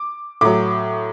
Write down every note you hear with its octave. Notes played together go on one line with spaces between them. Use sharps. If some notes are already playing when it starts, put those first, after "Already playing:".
Already playing: D6
A2 F#3 D6